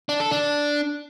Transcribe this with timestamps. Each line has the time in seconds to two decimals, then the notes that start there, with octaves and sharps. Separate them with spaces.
0.09 D4
0.20 A4
0.31 D4